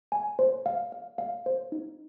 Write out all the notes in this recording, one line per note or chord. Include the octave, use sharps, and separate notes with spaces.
G#5
C5
F5
F5
F5
C5
D#4